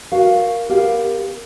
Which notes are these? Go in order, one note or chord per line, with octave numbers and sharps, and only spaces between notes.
F#4 A#4 B4 F5
B3 G4 A#4 F5